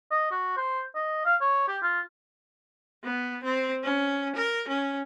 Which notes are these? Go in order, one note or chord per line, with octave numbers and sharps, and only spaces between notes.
D#5
F#4
C5
D#5
F5
C#5
G4
F4
B3
C4
C#4
A#4
C#4